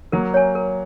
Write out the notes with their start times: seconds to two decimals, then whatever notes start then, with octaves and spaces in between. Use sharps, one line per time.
0.12 F#3 A#3 A#4
0.34 C#5 G#5
0.55 A#4